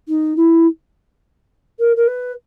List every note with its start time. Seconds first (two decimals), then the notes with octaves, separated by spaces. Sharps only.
0.08 D#4
0.36 E4
1.79 A#4
1.96 A#4
2.07 B4